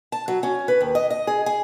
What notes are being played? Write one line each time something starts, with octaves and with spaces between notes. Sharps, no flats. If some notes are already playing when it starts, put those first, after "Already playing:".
A5
F#3
C#4
B4
D#2
D#5
D#5
G#4
G#4